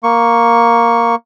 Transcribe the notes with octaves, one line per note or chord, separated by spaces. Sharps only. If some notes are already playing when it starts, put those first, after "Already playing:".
A#3 C#6